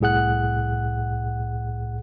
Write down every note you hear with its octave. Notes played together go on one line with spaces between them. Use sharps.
C2 A2 G#4 F#5 F#6